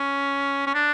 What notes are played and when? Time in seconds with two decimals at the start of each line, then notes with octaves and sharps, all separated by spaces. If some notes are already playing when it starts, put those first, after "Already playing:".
Already playing: C#4
0.67 C#4
0.74 D4